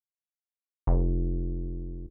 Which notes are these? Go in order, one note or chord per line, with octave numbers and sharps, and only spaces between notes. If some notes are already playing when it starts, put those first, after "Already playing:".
F1